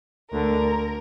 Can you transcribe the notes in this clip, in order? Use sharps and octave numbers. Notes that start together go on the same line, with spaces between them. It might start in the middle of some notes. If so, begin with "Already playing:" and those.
D2 D3 A#4